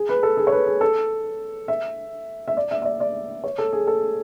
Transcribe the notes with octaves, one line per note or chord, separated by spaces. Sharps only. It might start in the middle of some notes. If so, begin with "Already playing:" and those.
Already playing: G#4
B4
A4
G#4
C#5
B4
G#4
A4
E5
E5
D5
E5
E5
D5
D5
C#5
A4
G#4
A4